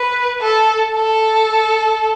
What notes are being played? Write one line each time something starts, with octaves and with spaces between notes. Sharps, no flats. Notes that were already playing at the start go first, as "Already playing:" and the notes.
Already playing: B4
A4
A4